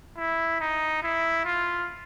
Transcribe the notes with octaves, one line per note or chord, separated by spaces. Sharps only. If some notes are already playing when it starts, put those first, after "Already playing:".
E4
D#4
E4
F4